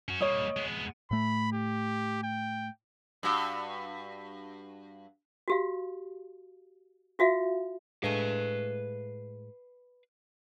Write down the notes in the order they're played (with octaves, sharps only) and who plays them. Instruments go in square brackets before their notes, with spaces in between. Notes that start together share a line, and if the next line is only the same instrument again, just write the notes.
[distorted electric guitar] C#4 F#4
[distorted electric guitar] G3 A#3 [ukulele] C#5 D#5
[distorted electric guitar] G#3 B3
[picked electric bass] A2 A3 [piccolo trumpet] B5
[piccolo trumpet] G4
G5
[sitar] G2 F#4
[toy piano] F#4 G4 F5
F4 F#4 E5 F5
[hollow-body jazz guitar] A2 G#3 A3 [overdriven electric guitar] B4 F5